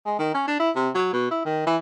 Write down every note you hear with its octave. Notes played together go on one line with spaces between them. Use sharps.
G#3
D#3
C#4
D4
E4
C3
F#3
B2
E4
D#3
E3